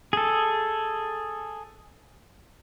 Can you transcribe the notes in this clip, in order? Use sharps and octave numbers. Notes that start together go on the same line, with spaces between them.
G#4 A4